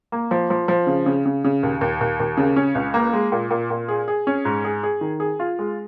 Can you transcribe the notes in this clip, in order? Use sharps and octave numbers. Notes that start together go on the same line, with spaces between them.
A#3
F3
F3
F3
C#3
C#3
C#3
C#3
D#2
D#2
D#2
D#2
C#3
C#4
C#2
A#3
G#3
A#2
A#2
A#2
G#4
G#4
C#4
G#2
G#4
G#4
D#3
G#4
F4
G#3